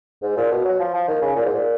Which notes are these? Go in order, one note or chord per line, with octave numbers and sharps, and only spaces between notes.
G#2
A#2
B2
F#3
F3
F3
D#3
C#3
A#2
G#2
A#2